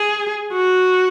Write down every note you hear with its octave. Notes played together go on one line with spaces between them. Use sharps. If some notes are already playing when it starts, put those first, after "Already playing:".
Already playing: G#4
F#4